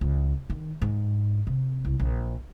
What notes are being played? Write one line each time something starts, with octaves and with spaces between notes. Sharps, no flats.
C#2
D#3
G#2
C3
C2
A#1